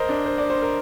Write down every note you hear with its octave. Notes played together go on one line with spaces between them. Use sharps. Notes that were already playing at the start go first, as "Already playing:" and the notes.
Already playing: A#4 C5 D#5
D4
C5
D5
C5
A#4